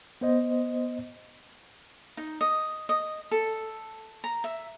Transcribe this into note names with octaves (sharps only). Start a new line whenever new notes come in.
B3 C5 D#5
D#4
D#5
D#5
A4
A#5
E5